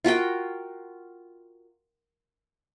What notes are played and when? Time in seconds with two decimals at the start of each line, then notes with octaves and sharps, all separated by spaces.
0.04 F4 F#4 A#4 G5